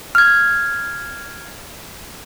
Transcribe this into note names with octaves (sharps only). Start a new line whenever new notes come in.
F6 G#6